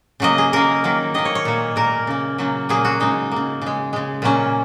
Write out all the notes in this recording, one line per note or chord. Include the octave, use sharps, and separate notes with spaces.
C#3 F#3 A#3 D#5
G#4
C#3 A#3 A#4
D#3 F#3 A#3
D#3 A#3 D#5
C#5
C#5
A#2 A#3
A#2 A#3 A#4
C#3 A#3
C#3 F#3 A#3
A#2 F#3 A#3 G#4
F#4
C#3 G#3 D#4
C#3 A#3
C#3 G#3
C#3 G#3
A#2 F#3 A#3 C#4